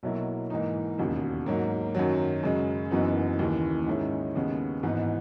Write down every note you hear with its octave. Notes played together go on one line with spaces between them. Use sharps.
B1 B2 F#3 A#3 E4
G#2 E3 A#3 D#4
E1 D#2 C#3
G#2 F#3 A#3
F#2 D#3 F#3
F#2 C#3 G#3
F#1 F#2 E3 B3 D#4
D#2 C#3 E3
G#2 D#3 G#3 C#4 E4
D#2 C#3 G#3 B3
G#1 G#2 E3 B3 D#4